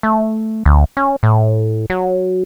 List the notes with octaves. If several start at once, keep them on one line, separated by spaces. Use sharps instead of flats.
A3
D2
C#4
A2
F#3